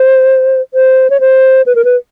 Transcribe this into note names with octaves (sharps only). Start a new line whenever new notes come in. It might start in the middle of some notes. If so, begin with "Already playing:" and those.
Already playing: C5
C5
C#5
C5
B4
A#4
B4